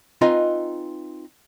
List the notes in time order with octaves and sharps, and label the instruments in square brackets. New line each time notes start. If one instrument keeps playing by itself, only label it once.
[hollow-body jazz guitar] C4 D#4 F4 B4 D#5 G#5